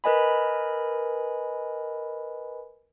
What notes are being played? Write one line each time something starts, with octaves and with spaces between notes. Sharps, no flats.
A#4 B4 D#5 G#5 B5